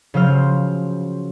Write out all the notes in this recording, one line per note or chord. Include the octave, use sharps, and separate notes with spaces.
C#3 F3 F#3 C5 F6